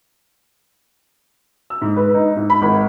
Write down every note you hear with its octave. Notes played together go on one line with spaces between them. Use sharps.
E6
G#2
B4
D#4
G#2
B5
G#1